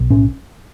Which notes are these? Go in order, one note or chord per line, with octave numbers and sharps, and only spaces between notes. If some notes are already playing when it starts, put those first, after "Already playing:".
Already playing: B1
A2 C#4